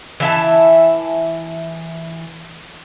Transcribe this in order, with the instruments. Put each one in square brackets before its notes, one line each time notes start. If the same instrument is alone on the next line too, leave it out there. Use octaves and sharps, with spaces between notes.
[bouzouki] E3 E5 A5